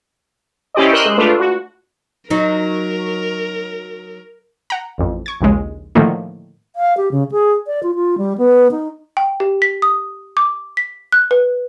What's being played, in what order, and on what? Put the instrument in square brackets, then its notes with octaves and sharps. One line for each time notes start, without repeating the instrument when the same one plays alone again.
[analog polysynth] C#4 E4 G4 C5 D5 D#5
A#4 D#5 C6 E6 F#6 G6
G#3
A3 D4 F4 B4
F#4
[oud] F#3 D#4 [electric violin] A#4
[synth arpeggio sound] F#5 A#5
A1 F2
C#6 G#6
A#1 D#2 C#3 G#3
A2 D3 D#3 F3 A3 A#3
[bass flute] F5
G4
C#3
G#4
D5
F4
F4
G3
B3
D#4
[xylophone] G5
G4
B6
D#6
D6
B6
F#6
B4